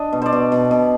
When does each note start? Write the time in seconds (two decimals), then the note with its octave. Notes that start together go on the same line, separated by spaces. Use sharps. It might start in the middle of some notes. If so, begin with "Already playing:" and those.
Already playing: D4 D#5
0.13 B2
0.22 C5 D5
0.33 B2
0.52 B2
0.71 B2